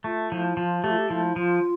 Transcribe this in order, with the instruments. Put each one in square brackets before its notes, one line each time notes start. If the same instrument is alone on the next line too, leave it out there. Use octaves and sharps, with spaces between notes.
[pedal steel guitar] A3 [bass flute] F4
[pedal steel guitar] F3 [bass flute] E4
[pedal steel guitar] F3 [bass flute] F4
[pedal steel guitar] A3 [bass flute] G4
[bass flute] F4
G4
[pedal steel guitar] F3 [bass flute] E4
[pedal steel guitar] F3 [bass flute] F4